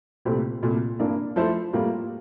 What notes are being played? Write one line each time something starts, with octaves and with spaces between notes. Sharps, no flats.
C2 A#2 A3 C4 G4
C2 A#2 A3
G2 E3 A#3 D4
F3 A3 E4 A4 C5
A2 G3 A#3 F4